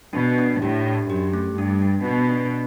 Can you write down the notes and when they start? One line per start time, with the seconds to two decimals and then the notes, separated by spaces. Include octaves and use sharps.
0.13 B2 D4
0.38 D4
0.62 A2 G4
0.86 D4
1.10 F#2 G4
1.33 A3
1.58 G2 D4
1.82 D4
2.05 B2 D4
2.29 D4